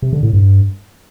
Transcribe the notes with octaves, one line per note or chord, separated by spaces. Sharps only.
C3
D3
A2
G2